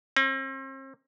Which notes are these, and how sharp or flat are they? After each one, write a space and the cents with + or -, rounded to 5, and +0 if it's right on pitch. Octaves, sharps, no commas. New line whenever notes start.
C4 +40